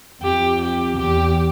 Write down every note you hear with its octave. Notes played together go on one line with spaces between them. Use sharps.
F2 G4
G4
E2 G4